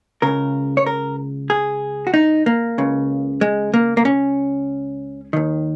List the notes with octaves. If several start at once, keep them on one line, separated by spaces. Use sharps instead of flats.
C#2 C#3 A#4
C#5
A#4
G#4
F#4
D#4
A#3
C#2 C#3
G#3
A#3
A#3
C#4
D#2 D#3